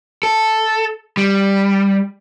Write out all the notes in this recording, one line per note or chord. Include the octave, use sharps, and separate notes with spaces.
A4
G3